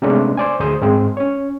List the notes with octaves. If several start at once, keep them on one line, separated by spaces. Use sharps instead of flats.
C3 G#3 A3 B3 C#4 D4
C5 D5 G#5
D2 G#4 C5 D#6
G#2 G#3 C4 G#4
C#4 C#5